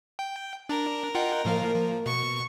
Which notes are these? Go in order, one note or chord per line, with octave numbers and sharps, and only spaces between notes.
G5
D4 A#4
F4 D#5 F#5 G5
A2 F3 A#3 F5
F3
B2 C#6